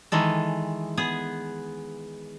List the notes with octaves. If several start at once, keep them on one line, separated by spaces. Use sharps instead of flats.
D#3 E3 G#3 A4
B3 G#4